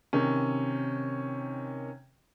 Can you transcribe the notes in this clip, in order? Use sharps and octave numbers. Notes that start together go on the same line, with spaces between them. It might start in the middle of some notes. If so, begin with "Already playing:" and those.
C3 D#3 C#4